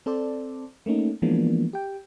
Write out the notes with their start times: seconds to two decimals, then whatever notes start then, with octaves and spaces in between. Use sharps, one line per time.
0.06 C4 A4 C5 D5
0.86 A3 A#3 C#4 D#4
1.22 E3 F3 G#3 A#3 B3 D4
1.73 G4 G5